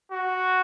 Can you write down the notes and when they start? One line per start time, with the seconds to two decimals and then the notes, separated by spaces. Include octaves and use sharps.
0.11 F#4